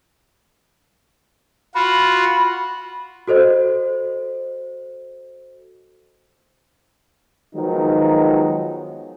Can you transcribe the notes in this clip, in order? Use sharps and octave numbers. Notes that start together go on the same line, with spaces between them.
F4 F#4 B5
F#4 A4 C5 D#5
D#3 F3 F#3 G#3 B3 D#4